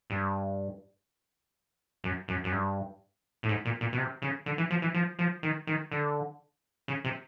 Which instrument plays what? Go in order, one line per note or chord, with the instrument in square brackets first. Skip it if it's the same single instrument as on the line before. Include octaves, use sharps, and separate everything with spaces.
[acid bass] G2
F#2
F#2
F#2
G2
A2
G#2
A#2
A#2
B2
C3
C#3
D3
E3
F3
E3
F3
F3
D#3
D#3
D3
C#3
C3